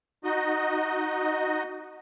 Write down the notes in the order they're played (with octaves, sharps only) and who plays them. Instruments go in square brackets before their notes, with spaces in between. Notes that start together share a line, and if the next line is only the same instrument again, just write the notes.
[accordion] D#4 F#4 D#5